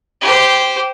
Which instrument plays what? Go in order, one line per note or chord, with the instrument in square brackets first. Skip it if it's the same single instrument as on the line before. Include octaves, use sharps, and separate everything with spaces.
[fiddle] G4 C5